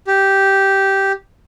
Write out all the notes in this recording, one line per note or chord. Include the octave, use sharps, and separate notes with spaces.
G4